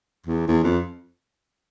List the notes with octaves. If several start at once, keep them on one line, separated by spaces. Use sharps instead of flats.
E2
E2
F2